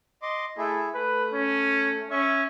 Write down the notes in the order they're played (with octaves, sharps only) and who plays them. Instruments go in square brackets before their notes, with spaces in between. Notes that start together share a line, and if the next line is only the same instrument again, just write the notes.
[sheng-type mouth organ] D#5 C6 D6
[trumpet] A3 [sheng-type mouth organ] E4 G#4
[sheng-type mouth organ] A3 [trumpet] B4
[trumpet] C#4
[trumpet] C#4 [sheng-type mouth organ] E5 C#6